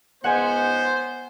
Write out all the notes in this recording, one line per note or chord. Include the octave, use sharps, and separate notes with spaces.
C#2 G#2 B3 C5 F#5 G#5